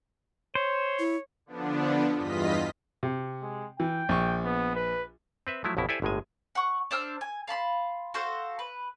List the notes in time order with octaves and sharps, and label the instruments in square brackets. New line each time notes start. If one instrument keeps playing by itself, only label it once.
[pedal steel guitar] C5 [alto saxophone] C#5
[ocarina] E4
[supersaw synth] D3 F3 B3 D4
E2 G2 F4 D#5 B6
[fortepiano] C3
[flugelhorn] G#3
[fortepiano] E3 [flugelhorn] G5
[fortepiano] A#1 C#6
[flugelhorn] B3
B4
[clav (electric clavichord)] C4 B4 E5
F3 F#3 A3 E4
A1 F2 B2 E4
E4 G4 A4 C5 D5 G#5
G1 A2 G#3 G#5
[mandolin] F#5 C#6
D4 C5 E6 F6
G#5
F5 A5 B5 C6
F#4 A4 C5 F5
B4